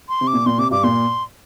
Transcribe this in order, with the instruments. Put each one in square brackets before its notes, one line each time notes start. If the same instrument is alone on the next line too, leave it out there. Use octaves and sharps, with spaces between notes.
[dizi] C6
[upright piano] C3
[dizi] D6
[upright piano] A#2
[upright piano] A#2 [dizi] C6
[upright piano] C3 [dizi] D6
[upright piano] G2 [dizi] D6
[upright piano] A#2 [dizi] C6